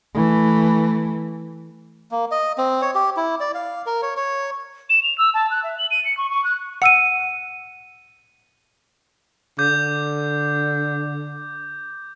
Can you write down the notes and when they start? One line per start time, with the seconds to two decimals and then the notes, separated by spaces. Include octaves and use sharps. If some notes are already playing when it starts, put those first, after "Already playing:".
0.15 E3 A3
2.11 A#3
2.31 D#5
2.58 C4
2.82 C#5
2.95 G4
3.17 E4
3.40 D5
3.55 F5
3.86 A#4
4.02 C#5
4.17 C#5
4.89 E7
5.03 F7
5.18 E6
5.34 A5
5.51 F#6
5.63 E5
5.78 F#7
5.91 D#7
6.05 C#7
6.17 C#6
6.30 C#6
6.44 F#6
6.82 F#5 E6 C#7 D#7
9.59 D3 D6 G6